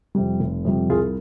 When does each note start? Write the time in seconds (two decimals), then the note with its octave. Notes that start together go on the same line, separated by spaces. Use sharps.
0.15 F2 C3 G3
0.40 F1
0.65 F2 C3 G3
0.89 C2 F4 G#4